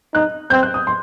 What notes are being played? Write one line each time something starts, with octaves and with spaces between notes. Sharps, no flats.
D#4 F#6
C4 G6
F#6
D#6
C6